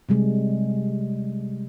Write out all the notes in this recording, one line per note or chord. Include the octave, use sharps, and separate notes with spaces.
C3 G3 G#3